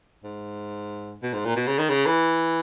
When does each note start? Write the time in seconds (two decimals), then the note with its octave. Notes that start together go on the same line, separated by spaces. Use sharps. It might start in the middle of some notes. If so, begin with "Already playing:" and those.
0.24 G#2
1.23 B2
1.33 G#2
1.45 A#2
1.56 B2
1.67 C#3
1.78 D#3
1.89 C#3
2.06 E3